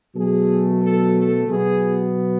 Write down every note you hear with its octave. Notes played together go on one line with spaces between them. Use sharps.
B2 F#3 A3 G#4
A4
A4
B2 F#3 B3 G#4